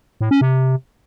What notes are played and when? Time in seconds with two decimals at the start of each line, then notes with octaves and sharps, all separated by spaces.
0.21 A2
0.31 C#4
0.41 C3